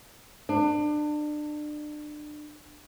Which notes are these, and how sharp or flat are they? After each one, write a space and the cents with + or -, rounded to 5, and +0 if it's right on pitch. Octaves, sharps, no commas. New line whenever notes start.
D4 +30